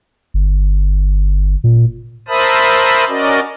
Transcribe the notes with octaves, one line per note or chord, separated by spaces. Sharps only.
G1
A#2
A#4 C5 E5 A5 B5 D#6
C#4 F#4 A#4 D5 D#5